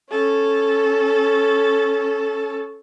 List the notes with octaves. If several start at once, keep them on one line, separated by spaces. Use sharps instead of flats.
C#4 A4